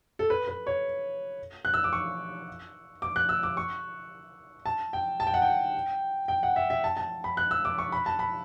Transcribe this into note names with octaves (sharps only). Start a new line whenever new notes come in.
A4
B4
B4
C#5
F#6
E6
D6
C#6
D6
F#6
E6
D6
C#6
A5
G5
A5
G5
F#5
G5
G5
F#5
E5
E5
A5
A5
B5
F#6
E6
D6
C#6
B5
A5
B5